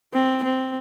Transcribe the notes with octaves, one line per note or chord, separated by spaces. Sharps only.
C4
C4